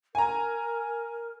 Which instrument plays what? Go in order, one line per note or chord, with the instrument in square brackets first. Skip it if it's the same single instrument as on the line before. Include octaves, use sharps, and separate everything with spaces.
[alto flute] A#4 [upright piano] G#5 A#5